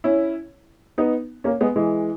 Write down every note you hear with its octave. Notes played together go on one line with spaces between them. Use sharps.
C#4 E4
B3 D#4
A#3 C#4
G#3 B3
E3 G#3